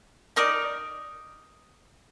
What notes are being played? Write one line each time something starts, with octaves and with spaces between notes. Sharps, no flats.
D#4 A#4 D5 D#6